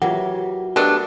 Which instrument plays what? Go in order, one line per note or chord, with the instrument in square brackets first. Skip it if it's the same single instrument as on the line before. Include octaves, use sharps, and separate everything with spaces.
[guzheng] E3 F#3 A#3 [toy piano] F4 F#5 [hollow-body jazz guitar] G4
[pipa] A3 B3 D4 [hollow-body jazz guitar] G4 [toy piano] A#4 D#5